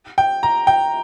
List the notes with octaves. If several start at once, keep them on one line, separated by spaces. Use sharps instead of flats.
G5
A#5
G5